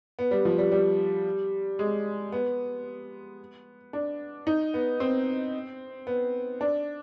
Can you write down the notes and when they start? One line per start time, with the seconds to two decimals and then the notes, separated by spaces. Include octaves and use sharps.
0.19 B3
0.31 G3
0.45 F3
0.58 G3
0.72 G3
1.79 G#3
2.32 B3
3.93 D4
4.47 D#4
4.74 B3
5.00 C4
6.07 B3
6.61 D4